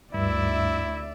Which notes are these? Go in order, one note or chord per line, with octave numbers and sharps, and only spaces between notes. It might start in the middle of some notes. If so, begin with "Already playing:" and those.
D2 G2 E4 D5 E5